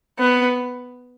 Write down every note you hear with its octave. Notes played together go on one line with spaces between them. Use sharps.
B3